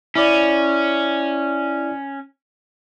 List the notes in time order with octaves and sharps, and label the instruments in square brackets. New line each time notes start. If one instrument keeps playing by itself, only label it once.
[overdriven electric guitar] C#4 [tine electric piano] E4 D5